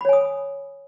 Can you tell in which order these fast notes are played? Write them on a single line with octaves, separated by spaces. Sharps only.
B5 C#5 G#5 D#6